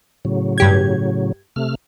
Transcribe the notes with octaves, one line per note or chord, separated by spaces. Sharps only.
A2 C#3 F#3
G2 G4 G#6
C3 A3 F6